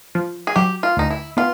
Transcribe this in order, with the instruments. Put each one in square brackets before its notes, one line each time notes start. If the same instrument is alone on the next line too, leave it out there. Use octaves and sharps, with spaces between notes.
[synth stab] F3
[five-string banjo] G#4
[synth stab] F#3 [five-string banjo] G4
[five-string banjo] F4
[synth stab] D2 [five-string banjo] D#4
[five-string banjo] E4
[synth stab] B3 [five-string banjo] F4